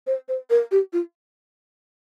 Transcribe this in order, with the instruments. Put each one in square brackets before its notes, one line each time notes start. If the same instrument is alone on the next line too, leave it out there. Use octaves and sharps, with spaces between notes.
[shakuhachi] C5
C5
A#4
G4
F4